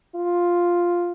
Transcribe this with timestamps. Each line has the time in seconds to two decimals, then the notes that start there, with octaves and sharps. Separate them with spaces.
0.15 F4